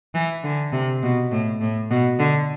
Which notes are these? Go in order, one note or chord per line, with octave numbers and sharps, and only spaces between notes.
E3
D3
C3
B2
A2
A2
B2
D3